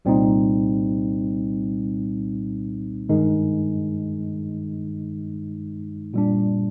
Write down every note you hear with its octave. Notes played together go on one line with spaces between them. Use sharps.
C2 A#2 G3 C4 D#4
G2 D#3 G#3 D#4
A#2 G3 D4